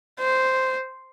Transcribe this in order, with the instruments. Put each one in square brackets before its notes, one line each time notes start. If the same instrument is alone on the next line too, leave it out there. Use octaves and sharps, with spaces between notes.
[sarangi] C5